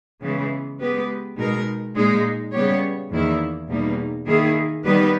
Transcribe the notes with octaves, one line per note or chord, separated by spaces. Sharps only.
C#3 E3 G#3 B3
G#3 B3 G4 B4
B2 G#3 D#4 A#4
A#2 G#3 D#4
C#3 G3 B3 G4 C#5
E2 D#3 A#3 E4
E2 B2 G3 A#3 D#4
D#3 A#3 E4 G#4
D#3 G3 B3 G4 B4